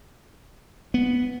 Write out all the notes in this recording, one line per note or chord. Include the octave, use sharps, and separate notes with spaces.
B3